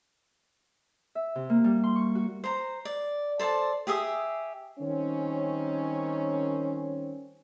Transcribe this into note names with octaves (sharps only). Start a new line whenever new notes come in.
E5
C3
A#3
G3
C6
C#6
F#4
C5 A#5
D5
A4 C5 D5 A5
G4 G#4 E5 D#6
D#3 G3 C4 C#4